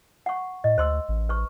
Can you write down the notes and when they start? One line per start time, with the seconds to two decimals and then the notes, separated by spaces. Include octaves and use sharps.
0.26 F#5 C#6
0.64 A2 D#5
0.78 D2 C5 C6 E6
1.08 A1
1.29 B4 C#6